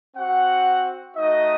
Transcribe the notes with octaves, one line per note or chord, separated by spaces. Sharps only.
C4 F#4 F#5
A3 D#4 F#4 D#5